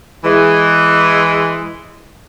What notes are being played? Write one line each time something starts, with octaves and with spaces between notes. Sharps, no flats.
E3 G#3